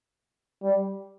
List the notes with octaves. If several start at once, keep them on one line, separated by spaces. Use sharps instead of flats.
G3